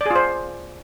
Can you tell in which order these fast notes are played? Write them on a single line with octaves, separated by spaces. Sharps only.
D5 G#4 F4 C5